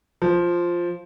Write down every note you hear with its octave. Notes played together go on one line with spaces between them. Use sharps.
F3